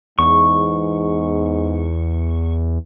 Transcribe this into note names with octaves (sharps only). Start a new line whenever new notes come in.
E2 G#2 C#6